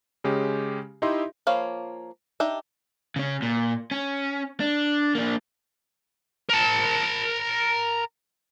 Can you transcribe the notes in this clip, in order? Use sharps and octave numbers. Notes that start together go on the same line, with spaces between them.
C#3 G#3 C#4 G4
D#4 E4 G4 D#5 E5 C6
F3 A#3 C#5 F5 B5
D4 D#4 G4 E5
C#3 C#4
A#2
C#4
D4
A#3 D4
A#4 A5